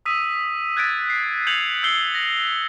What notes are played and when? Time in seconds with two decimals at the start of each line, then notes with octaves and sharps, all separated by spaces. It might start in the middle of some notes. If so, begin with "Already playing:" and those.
0.06 D#6 E6 B6 D#7
0.77 F#6 G#6 A6 B6 D7
1.10 C7
1.47 G6 G#6 C#7 F7 F#7
1.83 E6 G6 C7 C#7 G7
2.15 A#6